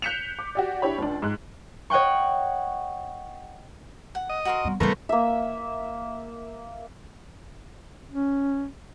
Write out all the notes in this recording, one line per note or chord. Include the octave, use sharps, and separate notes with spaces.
F#6 G6 B6 C#7 E7 F7
D6
F#4 G4 D5
D4 E4 G4 C#5 B5
C#2 D4
G#2 F#6
C#5 D#5 F#5 G5 C#6
F#5
D#5
F#4 A#4 C6
G3 B3
D#3 G3 A3 B3 A#4 C5 F5 C#6
A#3 E5
C#4